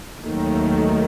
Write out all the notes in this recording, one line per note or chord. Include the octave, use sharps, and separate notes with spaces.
D#2 D#3 F#3 A3